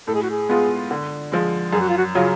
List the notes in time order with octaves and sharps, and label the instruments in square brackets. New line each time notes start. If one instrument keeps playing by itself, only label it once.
[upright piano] A2 [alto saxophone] A4
[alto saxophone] G#4
F#4
G#4
[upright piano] G#3 B3 F4
D3
F3 G#3
[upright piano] F#2 [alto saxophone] G#4
[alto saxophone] F#4
F4
F#4
[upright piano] C#3 F#3 C#4 [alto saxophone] F4